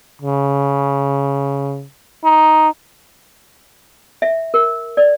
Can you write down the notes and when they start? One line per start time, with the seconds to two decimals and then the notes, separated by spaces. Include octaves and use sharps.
0.22 C#3
2.24 D#4
4.22 E5
4.54 A#4
4.97 D5